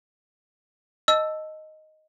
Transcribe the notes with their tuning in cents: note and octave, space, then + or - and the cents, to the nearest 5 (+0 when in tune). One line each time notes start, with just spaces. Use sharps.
D#5 +0 A5 +0 E6 +0